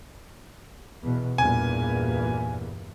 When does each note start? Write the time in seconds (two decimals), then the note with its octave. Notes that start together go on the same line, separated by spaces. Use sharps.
1.01 E2 B2
1.38 E2 G2 A#2 G#5